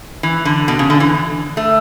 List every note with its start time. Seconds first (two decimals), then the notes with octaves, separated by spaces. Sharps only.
0.23 E3
0.45 D3
0.68 B2
0.79 C#3
0.90 D3
1.00 E3
1.57 A3